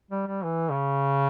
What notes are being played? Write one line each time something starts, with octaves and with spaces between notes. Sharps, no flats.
G3
G3
E3
C#3